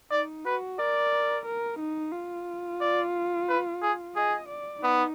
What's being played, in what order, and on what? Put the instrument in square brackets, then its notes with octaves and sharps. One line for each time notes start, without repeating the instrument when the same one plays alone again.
[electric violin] D#4 [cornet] D5
[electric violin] F#4 [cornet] B4
[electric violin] A#4 [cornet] D5
[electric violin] A#4
D#4
F4
[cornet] D5
B4
G#4
[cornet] G#4 [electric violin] D#5
[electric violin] D5
[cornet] B3 [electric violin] D#4